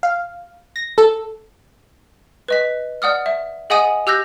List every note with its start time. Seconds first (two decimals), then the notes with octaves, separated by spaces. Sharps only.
0.03 F5
0.76 A#6
0.98 A4
2.48 B4 D#5 B6
3.02 D5 F#5 D#6 F6
3.26 E5
3.70 G#4 D#5 F#5 G#5 D#6 D#7
4.07 G4 E6 F#6 G6 A#6